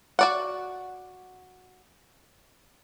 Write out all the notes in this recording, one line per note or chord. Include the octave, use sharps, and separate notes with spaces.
F#4 D5 F#5